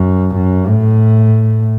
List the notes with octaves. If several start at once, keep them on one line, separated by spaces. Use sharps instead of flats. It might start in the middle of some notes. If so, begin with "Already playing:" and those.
Already playing: F#2
F#2
A2